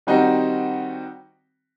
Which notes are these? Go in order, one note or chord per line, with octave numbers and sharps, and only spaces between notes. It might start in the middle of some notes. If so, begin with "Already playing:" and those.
D#3 G3 C4 D#4 F#4